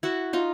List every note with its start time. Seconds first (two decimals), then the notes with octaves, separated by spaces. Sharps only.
0.03 E4 F#4
0.33 D#4 F4